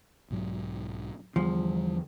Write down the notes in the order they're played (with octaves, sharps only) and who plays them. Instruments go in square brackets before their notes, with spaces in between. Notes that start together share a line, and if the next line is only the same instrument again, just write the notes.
[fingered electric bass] B1 G#2 F#3
[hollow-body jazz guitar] E2 F3 [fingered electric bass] D3 G3